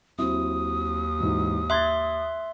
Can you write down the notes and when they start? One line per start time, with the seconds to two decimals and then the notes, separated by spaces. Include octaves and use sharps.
0.18 D#2 F#3 C4 E4 D#6
1.19 G#2 E3 F#4
1.70 E5 C6 F#6 G#6 A6